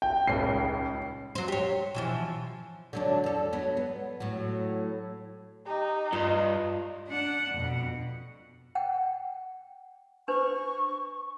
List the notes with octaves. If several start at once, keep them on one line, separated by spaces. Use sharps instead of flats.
G5
D#1 C#2 C#3 C7
F#3 C5
G4 C#5
B2 E3 F3
D3 F#3 D4
E2 A4
F#3 B3
B3
A2 F#3
D#4 G4
G2 F4 D#5
D4 F#5
F2 B2
F#5 G5
D4 B4 C5 C#6